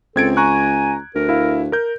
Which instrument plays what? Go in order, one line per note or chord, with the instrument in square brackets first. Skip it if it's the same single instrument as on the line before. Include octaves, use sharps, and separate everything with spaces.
[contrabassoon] C#2 [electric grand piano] C4 G#6 D7 [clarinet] A4
[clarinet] G#5 [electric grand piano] A#5 C#6 F#6
[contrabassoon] D2 [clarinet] A#4
[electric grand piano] E4 F5
A#4 G6